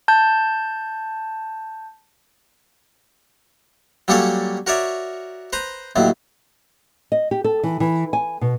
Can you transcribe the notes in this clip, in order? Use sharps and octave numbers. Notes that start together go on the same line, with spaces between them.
A5 G6
F#3 G3 A#3 C#4 A4 C#5
F#4 A#4 C#5 D5 E5
B4 C5 A#5
D#2 A2 F#3
D#5
G4
A4
E3
E3
G#5
B2